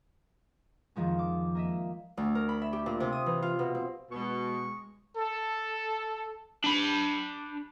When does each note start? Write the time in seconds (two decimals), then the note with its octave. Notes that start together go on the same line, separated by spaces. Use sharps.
0.96 F2 D#3 F3 G#3 C#4
1.19 D6
1.55 A#3 D#5 E5
2.17 D2
2.35 A#4
2.49 B5
2.62 E5
2.73 G4
2.86 A#2
3.00 C3
3.13 D#6
3.26 E3
3.42 F4
3.59 B2
3.75 C4
4.11 B2 G#3 C#6
5.17 A4
6.64 D4 B5